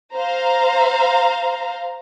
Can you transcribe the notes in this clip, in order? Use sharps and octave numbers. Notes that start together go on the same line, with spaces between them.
C5 F5 A#5